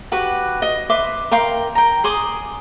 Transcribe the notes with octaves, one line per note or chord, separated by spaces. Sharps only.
F#4 G4 B4
D#5
B4 E5 C6 D6
A#4 F5 G5 C6
G5 A#5
G#4 C6 D6 D#6